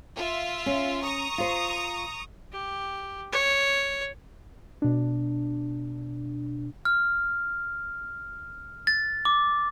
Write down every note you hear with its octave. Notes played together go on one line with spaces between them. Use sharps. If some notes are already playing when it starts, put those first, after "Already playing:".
F4 E5
C#4
A#5 C#6 D#6
F4 C5
G4
C#5
B2 D4
F6
A6
D6